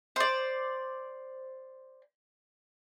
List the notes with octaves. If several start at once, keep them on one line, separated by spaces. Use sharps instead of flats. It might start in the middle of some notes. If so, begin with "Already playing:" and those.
C5 D5